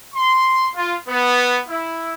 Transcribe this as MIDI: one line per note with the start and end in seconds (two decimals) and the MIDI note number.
0.13 0.67 84
0.73 0.93 65
1.06 1.59 59
1.66 2.13 64